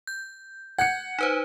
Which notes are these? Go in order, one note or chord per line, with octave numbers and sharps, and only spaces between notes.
G6
F#5 G6 G#6 C#7
D#4 B4 C5